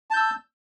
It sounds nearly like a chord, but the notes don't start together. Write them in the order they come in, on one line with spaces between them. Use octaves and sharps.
A5 G6 E6